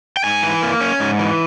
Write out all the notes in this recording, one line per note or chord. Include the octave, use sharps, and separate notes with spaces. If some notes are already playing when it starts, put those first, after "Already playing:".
G5
G#2 G#5
E3
A#3
C#4
G#2
E3